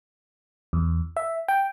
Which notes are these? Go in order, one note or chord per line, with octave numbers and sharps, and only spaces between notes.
E2
E5
G5